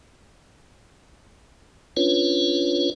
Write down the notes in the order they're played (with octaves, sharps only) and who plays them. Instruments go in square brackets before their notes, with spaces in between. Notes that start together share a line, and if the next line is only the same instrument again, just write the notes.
[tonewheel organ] C#4 D4 F4 B4 C#5